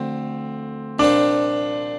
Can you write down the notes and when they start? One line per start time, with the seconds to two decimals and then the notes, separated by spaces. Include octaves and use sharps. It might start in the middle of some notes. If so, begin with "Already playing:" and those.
Already playing: D2 D3 F3 A3 C4
0.99 C2 A#2 F3 C4 D4 D#4